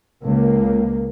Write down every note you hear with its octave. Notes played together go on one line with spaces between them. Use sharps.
C#2 A#3